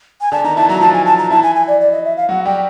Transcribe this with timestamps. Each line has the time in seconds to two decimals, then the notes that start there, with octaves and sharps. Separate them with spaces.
0.21 G#5
0.32 D3 D4 A5
0.44 D#3 D#4 A#5
0.57 E3 E4 A5
0.69 F#3 F#4 A#5
0.81 F3 F4 A5
0.93 G#5
1.06 A5
1.18 A#5
1.30 E3 E4 A5
1.43 G#5
1.55 G#5
1.68 D5
1.80 D5
1.92 D#5
2.05 E5
2.17 F5
2.29 F#3 F#4 F#5
2.45 G3 G4 G5